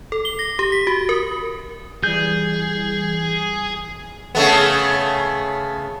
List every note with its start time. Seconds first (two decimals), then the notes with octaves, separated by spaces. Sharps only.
0.12 A4
0.25 G7
0.39 A#6
0.59 G4
0.72 B6
0.87 F#4
1.09 A#4
2.04 E3 G3 G#4 G6
4.35 C#3 A3 B3